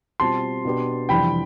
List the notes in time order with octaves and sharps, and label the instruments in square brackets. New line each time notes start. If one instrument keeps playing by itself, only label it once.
[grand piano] B2 G3 C4 F4 C5 [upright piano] A5 C6
[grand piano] B2 B3 D4 G4 B4
[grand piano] F2 C3 E3 G3 D4 [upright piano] G5 B5